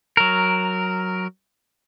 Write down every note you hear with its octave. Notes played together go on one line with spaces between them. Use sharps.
F#3 A#4